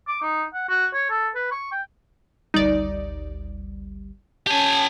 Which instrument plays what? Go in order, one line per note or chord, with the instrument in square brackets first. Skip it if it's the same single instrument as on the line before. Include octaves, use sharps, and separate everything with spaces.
[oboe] D6
D#4
F#5
F#4
C#5
A4
B4
C#6
G5
[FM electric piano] G#1 D2 G3 [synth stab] D#4 D5
[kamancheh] C#4 A5 [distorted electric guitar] G4 G#5